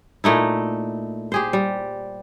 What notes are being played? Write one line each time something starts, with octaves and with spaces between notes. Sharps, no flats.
A#2 A3 D#4 E4
G4 G#4 C5
G3